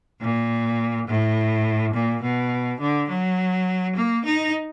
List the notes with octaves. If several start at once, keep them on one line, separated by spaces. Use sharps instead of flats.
A#2
A2
A#2
B2
D3
F#3
A#3
D#4